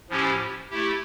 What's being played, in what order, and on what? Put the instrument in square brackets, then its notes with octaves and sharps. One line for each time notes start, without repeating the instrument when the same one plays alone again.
[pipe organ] A2 F3 C#4 E4 G4
A3 E4 G4